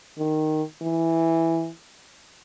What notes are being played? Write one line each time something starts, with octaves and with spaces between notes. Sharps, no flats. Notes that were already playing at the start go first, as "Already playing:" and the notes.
D#3
E3